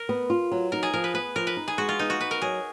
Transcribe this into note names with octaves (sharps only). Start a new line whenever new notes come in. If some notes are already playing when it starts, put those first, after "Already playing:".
Already playing: A#4
B3
F4
F#3
D#4 A#4
G#4
F3 A#4
B4
B3 B4
F3 A#4
B4
D#4
G#4
G#3 F#4
F4
B3 D#4
F#4
B3 B4
A#4
F#3 G#4